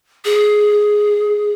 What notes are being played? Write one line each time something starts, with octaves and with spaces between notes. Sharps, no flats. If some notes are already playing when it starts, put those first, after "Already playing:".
G#4